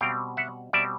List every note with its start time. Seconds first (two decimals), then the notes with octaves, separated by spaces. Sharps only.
0.01 B2 G3 C4 F5 G5
0.37 E5 F#5
0.73 B2 G3 C4 D5 E5